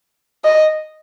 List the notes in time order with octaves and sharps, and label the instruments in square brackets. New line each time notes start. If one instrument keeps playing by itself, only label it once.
[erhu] D#5